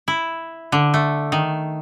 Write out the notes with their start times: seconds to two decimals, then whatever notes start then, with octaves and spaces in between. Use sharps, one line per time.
0.08 E4
0.72 D3
0.94 A3
1.32 D#3